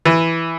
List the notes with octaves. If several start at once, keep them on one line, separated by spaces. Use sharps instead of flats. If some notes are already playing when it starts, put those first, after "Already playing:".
E3